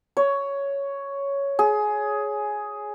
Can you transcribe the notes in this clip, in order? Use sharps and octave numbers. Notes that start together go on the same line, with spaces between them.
C#5
G#4